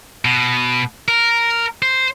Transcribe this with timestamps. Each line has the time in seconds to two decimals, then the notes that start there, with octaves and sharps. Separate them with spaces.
0.25 B2
1.08 A#4
1.82 C5